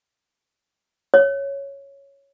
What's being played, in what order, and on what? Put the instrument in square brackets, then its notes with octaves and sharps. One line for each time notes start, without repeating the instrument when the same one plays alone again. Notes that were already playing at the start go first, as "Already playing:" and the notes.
[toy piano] C#5